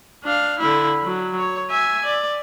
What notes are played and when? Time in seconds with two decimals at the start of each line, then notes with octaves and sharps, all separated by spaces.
0.24 D4 F5
0.59 D3 E4
1.03 F#3
1.39 C#5
1.71 E5 G#5
2.05 D5